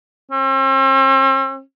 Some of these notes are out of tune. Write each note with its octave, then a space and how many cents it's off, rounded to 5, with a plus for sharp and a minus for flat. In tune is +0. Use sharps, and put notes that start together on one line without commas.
C4 +45